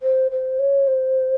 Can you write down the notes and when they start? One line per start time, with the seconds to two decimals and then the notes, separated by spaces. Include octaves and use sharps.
0.03 C5
0.31 C5
0.59 C#5
0.87 C5